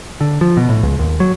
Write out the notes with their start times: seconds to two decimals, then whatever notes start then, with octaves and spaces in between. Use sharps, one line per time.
0.21 D3
0.41 F3
0.57 B2
0.69 A2
0.83 C#2
0.99 D#2
1.20 F#3